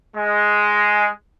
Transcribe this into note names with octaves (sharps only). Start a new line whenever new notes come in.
G#3